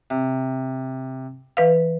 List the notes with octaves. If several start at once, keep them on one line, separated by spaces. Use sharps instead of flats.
C3
E3 B4 F5